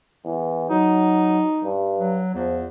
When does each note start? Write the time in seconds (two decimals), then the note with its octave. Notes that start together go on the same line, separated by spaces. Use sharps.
0.25 E2
0.70 F#3 D#4
1.64 G2
1.98 F#3
2.34 E2 F3